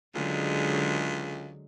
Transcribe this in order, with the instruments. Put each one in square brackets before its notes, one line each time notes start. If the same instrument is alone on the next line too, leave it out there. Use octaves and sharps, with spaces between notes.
[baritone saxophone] C#2 [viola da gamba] D3 F#3 G#3